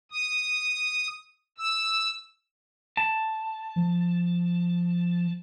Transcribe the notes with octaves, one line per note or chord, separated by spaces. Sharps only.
D#6
E6
A5
F3